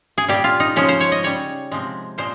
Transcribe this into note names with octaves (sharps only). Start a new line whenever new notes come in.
G#4
A#2 G3 G4
F4
D#4
C#3 F3 G#3 C#4
C5
C#5
D#5
C#3 G3 C#5
C3 F3 G#3
A#2 F3 G#3 C5